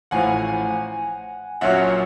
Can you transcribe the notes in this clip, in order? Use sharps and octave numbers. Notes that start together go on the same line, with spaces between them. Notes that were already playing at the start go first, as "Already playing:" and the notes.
A1 A2 F3 F#5 G#5
A#1 A#2 F#3 A#3 C#4 E5 F#5